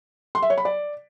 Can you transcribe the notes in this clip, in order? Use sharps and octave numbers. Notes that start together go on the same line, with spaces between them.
C6
E5
C#5
B5
D5